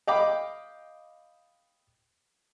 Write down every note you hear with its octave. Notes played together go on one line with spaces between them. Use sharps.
D#5 F5 G5 B5 D6